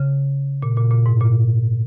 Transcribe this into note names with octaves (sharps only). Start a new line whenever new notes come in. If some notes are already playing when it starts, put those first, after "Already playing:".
Already playing: C#3
A#2
A#2
A#2
G#2
A#2